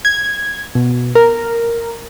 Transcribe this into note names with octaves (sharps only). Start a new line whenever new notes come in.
G#6
B2
A#4